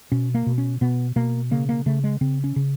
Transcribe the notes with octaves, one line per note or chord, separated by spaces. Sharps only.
B2 C#4
A#3
B2
C#4
B2 B3
B2 A#3
C#3 A#3
A#3
C#3 A3
G#3
C#3 C4
C#4
C#3